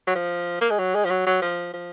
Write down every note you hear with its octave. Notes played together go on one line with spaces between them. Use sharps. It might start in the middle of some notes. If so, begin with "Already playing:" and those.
F#3
F3
A#3
G#3
F#3
G#3
F3
F#3
F#3
F3
F3